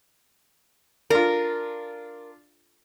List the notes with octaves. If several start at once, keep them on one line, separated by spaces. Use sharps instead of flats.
D4 F4 A#4